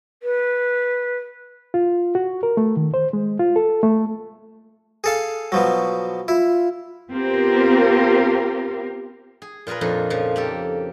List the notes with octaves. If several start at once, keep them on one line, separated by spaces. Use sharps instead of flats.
B4
F4
F#4
A#4
A3
D#3
C5
G#3
F4
A4
A3
G#4 A4 F5
B2 F3 F#3
E4 F4
B3 C4 F4 G4 A#4
G#4
A#2 F4 G#4 A#4 B4
F2 A#2 D4 D#4
A#2 C#3 F3
A#3 G4 A4